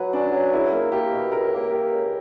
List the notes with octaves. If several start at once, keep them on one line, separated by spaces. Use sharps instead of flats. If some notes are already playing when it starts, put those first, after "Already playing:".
Already playing: F#3 B4
C#4 D4
F#3
C#2 E4
A#3
A#3 G4
B2
C#2 A#4
A#3
A#3 G4
C#2